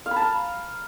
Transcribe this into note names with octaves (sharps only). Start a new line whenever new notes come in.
F5
B5
A5
A#5